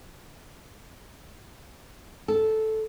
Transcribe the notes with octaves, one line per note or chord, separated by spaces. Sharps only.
A4